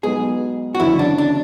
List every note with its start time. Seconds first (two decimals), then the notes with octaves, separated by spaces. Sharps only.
0.03 B1 B2 G#3 B3 G#4
0.75 F#4
0.80 F#1 E2 D3 F#3 C#4 E4
0.99 D4
1.18 D4